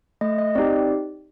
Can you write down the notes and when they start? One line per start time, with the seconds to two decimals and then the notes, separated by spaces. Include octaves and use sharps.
0.21 A3 D#5
0.38 D#5
0.55 C4 D#4 G4 D5